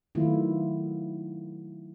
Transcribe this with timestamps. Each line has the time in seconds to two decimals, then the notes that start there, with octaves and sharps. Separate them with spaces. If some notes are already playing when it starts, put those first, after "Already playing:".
0.15 D#3 F#3 A3 B3 E4 F4